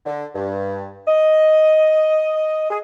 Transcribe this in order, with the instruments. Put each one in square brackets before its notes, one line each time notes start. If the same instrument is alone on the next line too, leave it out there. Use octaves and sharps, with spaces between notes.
[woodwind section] D3
G2
D#5
G#4